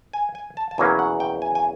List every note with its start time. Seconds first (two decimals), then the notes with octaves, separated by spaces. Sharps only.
0.13 G#5
0.35 G#5
0.57 A5
0.71 A5
0.78 E2 B2 F#3 A#3 C#4 G#5
0.99 F#5
1.20 G5
1.42 G#5
1.55 G#5